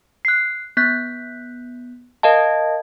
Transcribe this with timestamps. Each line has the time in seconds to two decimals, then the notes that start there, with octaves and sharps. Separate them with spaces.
0.25 F#6 C7
0.77 B3 F#6 G6 B6
2.23 A#4 D#5 F5 A5